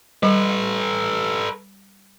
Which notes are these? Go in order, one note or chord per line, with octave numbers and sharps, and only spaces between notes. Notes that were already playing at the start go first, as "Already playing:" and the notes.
G3 A4 B4